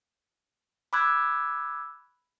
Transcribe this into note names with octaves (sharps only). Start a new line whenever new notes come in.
B5 D6 E6 F#6 G#6